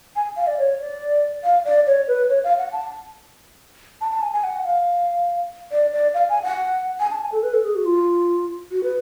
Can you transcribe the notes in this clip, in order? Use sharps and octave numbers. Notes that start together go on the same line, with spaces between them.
G#5
F5
D5
C#5
D5
F5
D5
C#5
B4
C#5
F5
F#5
A5
A5
A5
G#5
G#5
F#5
F5
D5
D5
F5
G#5
F#5
G#5
A5
G#5
A4
B4
A4
G#4
F#4
F4
F#4
B4